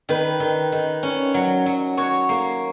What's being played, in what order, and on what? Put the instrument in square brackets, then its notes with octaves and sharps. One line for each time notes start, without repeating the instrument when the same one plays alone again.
[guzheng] D#3 [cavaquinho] B4
[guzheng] D#3
D#3
C#4
F#3
F#3
[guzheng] F#4 [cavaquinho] C#5
[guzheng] A#3